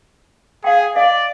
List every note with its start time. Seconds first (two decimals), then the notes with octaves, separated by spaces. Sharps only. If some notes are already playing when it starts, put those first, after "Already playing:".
0.64 G#4 F5 G5
0.96 D5 D#5 F5